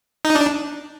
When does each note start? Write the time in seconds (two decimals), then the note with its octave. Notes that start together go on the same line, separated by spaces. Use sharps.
0.25 D#4
0.35 D4